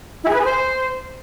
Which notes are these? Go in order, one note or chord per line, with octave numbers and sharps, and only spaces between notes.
E4
G#4
B4
G#4
C5